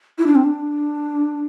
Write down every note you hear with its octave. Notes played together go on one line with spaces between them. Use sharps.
E4
D4
C4
D4